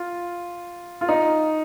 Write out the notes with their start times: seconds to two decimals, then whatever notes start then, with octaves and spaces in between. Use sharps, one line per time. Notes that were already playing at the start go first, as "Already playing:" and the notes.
Already playing: F4
1.01 F4
1.08 D#4